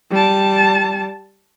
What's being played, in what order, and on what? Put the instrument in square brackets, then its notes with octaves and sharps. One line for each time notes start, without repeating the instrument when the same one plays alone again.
[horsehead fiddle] G3 A5